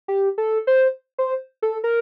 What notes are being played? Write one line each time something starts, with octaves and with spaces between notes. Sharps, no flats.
G4
A4
C5
C5
A4
A#4